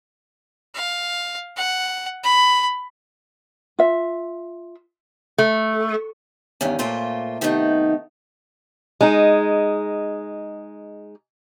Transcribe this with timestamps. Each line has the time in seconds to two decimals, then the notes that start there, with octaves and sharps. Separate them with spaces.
0.75 F5
1.57 F#5
2.23 B5
3.79 F4 E5
5.38 A3
6.61 E2 G2 D#3 C#4
6.79 A#2 A3 A#3 F4 C5
7.41 C3 D#3 A3 B3 C#4 D#4
9.01 G#3 D#4